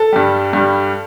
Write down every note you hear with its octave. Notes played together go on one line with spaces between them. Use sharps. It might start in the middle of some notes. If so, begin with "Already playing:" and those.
Already playing: A4
G2 G3
G2 G3